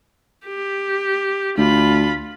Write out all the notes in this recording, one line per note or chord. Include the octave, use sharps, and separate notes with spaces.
G4
D2 F4 B5